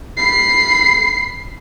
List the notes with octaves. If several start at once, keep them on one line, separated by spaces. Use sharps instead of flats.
B5 C7